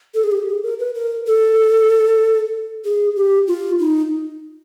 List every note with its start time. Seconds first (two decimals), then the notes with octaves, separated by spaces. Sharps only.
0.14 A4
0.24 G#4
0.32 G4
0.48 G#4
0.63 A#4
0.79 B4
0.95 A#4
1.27 A4
2.85 G#4
3.16 G4
3.48 F4
3.80 D#4